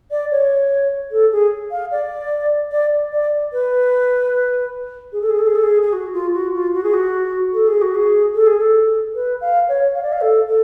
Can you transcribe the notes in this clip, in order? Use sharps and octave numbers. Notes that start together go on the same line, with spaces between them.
D5
C#5
A4
G#4
F5
D5
D5
D5
B4
G#4
A4
G#4
A4
G#4
A4
G#4
G#4
F#4
F4
F#4
F4
F#4
G#4
F#4
A4
G#4
F#4
G#4
A4
G#4
A4
B4
F5
C#5
F5
D5
F5
A4
A4